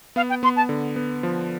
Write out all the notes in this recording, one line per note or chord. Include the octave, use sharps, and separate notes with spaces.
B3 F5
G5
B3 C6
A5
D3
B3
F3